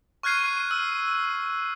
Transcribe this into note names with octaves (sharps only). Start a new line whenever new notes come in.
C#6 F6 F#6 G#6 C7 D#7
E6